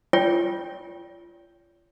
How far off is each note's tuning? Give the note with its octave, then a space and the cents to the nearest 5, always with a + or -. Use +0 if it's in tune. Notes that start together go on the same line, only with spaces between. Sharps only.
F4 -30 C#5 +45 G5 +0